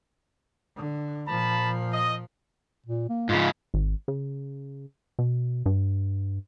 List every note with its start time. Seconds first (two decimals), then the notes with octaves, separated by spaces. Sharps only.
0.76 D3
1.27 A#2 F3 A5 B5
1.93 D#5
2.86 A#2
3.09 A#3
3.29 G#2 C#3 F4
3.74 G#1
4.08 C#3
5.19 B2
5.66 G2